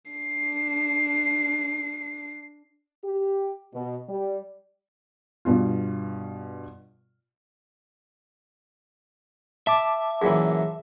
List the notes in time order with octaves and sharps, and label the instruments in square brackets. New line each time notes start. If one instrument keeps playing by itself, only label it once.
[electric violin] D4 C7
[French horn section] G4
B2
G3
[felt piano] G2 B2 F4
[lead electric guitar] E5 [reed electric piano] A5 D6
[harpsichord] F#2 A#2 E3 [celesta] G#4